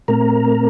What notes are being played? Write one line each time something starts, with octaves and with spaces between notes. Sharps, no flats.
A#2 A3 C4 A#4 A#5